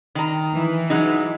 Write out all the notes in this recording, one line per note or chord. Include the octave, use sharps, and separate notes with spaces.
D#3 A#5
E3
F#3 G#3 D#4